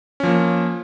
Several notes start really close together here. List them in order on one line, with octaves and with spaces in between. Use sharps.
C#4 F3 A#3